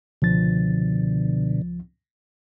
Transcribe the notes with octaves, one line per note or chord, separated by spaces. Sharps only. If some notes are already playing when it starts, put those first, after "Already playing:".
C#2 B2 D3 F3 A6